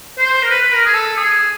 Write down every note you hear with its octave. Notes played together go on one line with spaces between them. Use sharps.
C5
A#4
B4
B4
A#4
G#4
A4
G#4